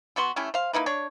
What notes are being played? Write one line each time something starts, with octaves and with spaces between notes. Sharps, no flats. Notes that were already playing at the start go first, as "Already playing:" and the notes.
B2 B3 F#4 C6
A3 C#4 E4 G4
C5 F5
A#3 D#4 E4 B4
D4 C#5